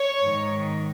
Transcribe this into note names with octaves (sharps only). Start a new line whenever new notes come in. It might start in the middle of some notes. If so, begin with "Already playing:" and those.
Already playing: C#5
G#2 D#3